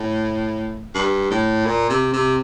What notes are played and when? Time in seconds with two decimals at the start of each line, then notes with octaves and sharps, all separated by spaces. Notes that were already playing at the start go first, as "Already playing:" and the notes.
Already playing: A2
0.94 G2
1.30 A2
1.66 A#2
1.90 C3
2.13 C3